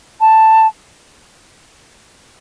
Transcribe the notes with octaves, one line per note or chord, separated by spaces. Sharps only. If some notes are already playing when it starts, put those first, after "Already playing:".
A5